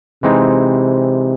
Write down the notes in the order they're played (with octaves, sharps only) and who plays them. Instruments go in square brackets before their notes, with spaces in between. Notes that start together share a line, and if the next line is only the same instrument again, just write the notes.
[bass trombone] C3 [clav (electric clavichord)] E3 G#3 C4 D#4